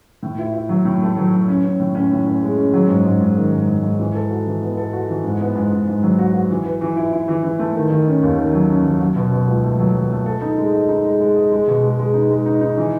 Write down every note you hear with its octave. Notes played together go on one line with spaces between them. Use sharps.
A2
E4
E4
F#3
A2
A3
F#3
F#3
C#4
C#4
A2
C#4
A2
C#4
G#3
C#4
F#3
G#2
G#2
G#2
D#3
G#2
G#2
G#2
E3
A4
F#4
E3
B3
A4
F#4
E3
G#2
B3
G#2
G#2
G#2
F#3
F#4
F#4
E3
B4
E3
E4
E4
E3
E3
A3
D#3
D#3
C#4
D#2
D#3
F#3
C#4
F#3
F#3
B2
B2
C#2
A3
F#3
F#3
A3
A4
D#4
G#3
D#5
D#4
G#3
G#3
D#5
G#3
B2
G#3
G#3
D#4
G#3
D#4
D#4
E3